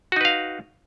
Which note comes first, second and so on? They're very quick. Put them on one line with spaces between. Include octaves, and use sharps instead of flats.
F#4 D#4 B4 F5